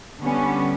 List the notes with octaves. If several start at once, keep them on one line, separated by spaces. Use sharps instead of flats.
D3 G3 B3 C#4